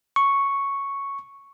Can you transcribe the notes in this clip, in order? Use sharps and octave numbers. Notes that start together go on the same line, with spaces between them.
C#6